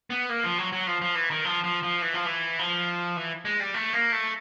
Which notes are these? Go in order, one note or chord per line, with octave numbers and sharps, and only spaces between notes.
B3
A#3
F3
F#3
F#3
F3
F3
E3
D#3
F3
F3
F3
E3
F3
E3
F3
E3
G#3
G3
A3
A#3
A3